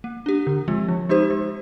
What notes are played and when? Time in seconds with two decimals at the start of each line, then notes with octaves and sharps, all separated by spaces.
0.04 A#3
0.26 D4 G4
0.47 D3
0.68 F3 G#3 C4 F4
0.88 F3
1.09 G#3 D#4 G4 C5
1.31 G#3